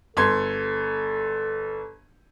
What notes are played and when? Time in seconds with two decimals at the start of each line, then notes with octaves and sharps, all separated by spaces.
0.17 G1 A4 C6 G#6